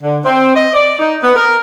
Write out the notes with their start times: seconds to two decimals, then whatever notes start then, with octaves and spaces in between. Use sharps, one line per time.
0.01 D3
0.24 C4
0.55 D#5
0.74 D5
0.99 D#4
1.23 B3
1.36 A#4